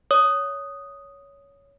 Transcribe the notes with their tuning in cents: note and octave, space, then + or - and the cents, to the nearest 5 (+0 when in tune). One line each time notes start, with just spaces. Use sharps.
C#5 +15 D#6 +0